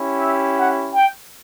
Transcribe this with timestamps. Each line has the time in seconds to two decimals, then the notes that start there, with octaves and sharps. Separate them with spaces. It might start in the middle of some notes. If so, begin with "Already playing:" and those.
Already playing: C#4 E4 G4
0.20 E5
0.58 F#5
0.95 G5